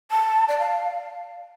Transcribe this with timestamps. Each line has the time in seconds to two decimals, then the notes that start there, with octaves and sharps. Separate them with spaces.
0.11 A5
0.48 D5
0.59 F5